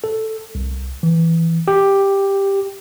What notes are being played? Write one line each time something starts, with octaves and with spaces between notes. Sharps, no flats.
A4
C2
E3
G4